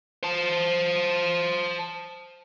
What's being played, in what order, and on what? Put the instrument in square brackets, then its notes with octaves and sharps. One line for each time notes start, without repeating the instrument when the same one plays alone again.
[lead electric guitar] C5 A5